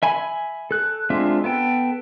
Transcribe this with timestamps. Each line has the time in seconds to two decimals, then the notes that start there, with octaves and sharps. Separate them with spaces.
0.03 E5 G#5 B5
0.71 A4 F#6
1.10 G#3 C4 D4 F4 E5
1.44 B3 A4 G5